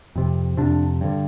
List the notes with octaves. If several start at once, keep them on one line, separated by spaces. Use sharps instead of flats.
F2 C3
F2 C3 D4
G2 D3